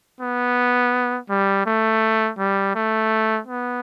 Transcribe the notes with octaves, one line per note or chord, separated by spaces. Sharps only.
B3
G3
A3
G3
A3
B3